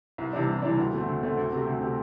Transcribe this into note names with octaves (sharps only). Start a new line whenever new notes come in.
C2
C3 E3 G3 D4
C2
C3 E3 G3 D4
D2
D3 A3 C4
D2
D3 A3 C4
D2
C3 A3 C4 G4
D2
C3 A3 C4 G4